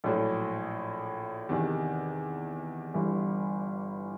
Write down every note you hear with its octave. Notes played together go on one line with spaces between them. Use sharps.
A#1 A2 F#3
E2 C3 D#3
G1 G2 E3